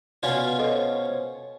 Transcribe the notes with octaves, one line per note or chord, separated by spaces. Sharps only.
B2 C#4 F4 D5
F#4 A4 C5 C#5 D#5